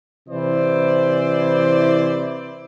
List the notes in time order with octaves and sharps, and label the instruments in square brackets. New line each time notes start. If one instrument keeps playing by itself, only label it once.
[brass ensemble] C3 E3 E4 C5 D5